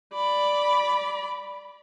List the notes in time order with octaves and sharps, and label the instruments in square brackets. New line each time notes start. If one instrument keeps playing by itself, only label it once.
[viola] D5 B5